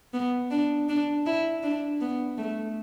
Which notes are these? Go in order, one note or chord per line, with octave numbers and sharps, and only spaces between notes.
B3
D4
D4
E4
D4
B3
A3